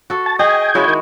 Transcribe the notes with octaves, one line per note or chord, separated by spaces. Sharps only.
F#4 A4
A5
G#4 D#5 G5 G#5
C#3 G#3 E4 F#4
D#3